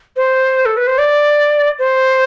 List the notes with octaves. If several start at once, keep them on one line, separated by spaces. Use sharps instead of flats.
C5
A4
B4
C5
D5
C5